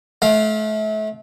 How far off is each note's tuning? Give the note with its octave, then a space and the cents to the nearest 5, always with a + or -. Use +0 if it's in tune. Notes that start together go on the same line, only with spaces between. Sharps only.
A3 -35 F5 +0